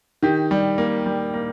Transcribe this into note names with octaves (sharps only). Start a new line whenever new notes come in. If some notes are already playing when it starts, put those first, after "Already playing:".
D#3 G4
G3
A#3
G3
A#3